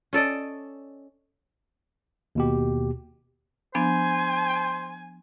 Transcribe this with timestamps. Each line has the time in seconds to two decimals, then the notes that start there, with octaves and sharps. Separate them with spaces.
0.13 C#4 A4 D5 D#5
2.35 D#2 B2 G4
3.75 F3 B3 D4 C5 G#5